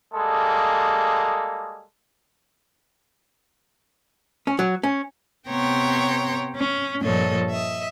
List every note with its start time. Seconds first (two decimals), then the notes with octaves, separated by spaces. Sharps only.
0.14 G3 G#3 A#3 A4 D#6
4.47 C#4
4.59 F#3
4.83 C#4
5.48 C3 B3 C#5 G5 A#5 C6
6.55 C#4
7.02 G2 A#2 F3 A4 C#5 D#5
7.51 D#5 E5